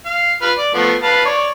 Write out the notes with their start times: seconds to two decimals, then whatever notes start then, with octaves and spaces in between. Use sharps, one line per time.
0.06 F5
0.42 F4 B4 F6
0.58 D5
0.74 F3 A3 B3
1.03 B4 F5 A5
1.25 C#5 D5